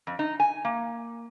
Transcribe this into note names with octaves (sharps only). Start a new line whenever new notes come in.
F2
D#4
G#5
A#3